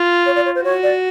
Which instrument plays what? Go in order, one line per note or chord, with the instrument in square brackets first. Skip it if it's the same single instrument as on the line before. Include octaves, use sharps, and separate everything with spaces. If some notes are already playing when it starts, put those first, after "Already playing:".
Already playing: [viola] F4
[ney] C#5
D5
C#5
C5
[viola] F#4 [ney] C#5
[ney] D5